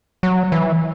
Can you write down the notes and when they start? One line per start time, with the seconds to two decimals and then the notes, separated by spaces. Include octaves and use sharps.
0.23 F#3
0.52 E3